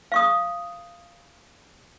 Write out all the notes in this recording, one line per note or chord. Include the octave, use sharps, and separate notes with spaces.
F5 C#6 D#6